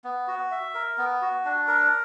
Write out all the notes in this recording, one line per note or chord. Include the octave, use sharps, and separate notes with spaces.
B3
F#4
E5
A#4
B3
F#4
D4
A#4